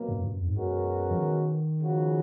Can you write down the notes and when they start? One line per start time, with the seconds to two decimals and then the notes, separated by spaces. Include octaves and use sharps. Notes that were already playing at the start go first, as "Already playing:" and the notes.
Already playing: B2 F#3 A#3
0.08 F#2
0.24 F#2
0.39 F2
0.48 G#2
0.55 F#2 B2 G#3 C#4 F#4 A#4
1.11 F3
1.18 D#3
1.80 C#3 F3 G#3 D#4 F#4